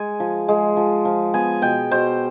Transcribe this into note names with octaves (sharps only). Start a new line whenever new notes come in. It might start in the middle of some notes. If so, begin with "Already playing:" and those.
Already playing: G#3 G#5
F3
G#3
F3
F3
B3 G#5
B2 G5
B2 C5